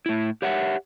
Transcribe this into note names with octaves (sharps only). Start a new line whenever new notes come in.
A2 E4
G4 C#5 E5 F#5